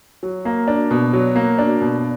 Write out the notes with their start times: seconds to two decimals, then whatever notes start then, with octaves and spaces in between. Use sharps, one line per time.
0.23 F#3
0.45 A#3
0.68 D4
0.91 B2
1.13 F#3
1.36 A#3
1.59 D4
1.81 B2